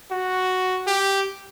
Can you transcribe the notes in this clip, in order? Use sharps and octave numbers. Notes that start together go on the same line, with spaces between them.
F#4
G4